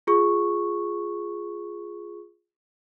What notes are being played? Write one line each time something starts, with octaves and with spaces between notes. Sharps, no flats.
F4 G#4 C#6